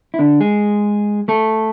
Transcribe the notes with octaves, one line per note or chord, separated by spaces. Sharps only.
E4
D3 D4
G#3 G#4
A3 A4